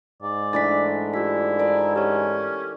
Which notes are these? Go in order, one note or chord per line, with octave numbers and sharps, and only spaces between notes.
G#2 D5
E3 A3 D4 A6 B6
E4 F4 G4 B6
A4 A#4 D5
C#4 G4 C#5